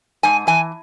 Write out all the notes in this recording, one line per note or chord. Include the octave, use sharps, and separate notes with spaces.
G#2 G#5
E3 G#5